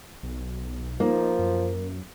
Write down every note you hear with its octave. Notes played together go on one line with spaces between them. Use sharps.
B1
F3 A#3 D#4
F#2